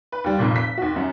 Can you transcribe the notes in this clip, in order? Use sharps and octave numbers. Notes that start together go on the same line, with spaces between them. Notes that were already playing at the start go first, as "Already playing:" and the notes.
B4
D#2 G3
F1 A#2
B6
D#2 F#4
F#2